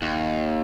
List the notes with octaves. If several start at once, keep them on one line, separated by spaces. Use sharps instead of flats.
D#2